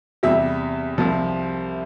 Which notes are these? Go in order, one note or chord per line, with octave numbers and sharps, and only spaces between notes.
E2 C3 G3 E5
C2 C3 F3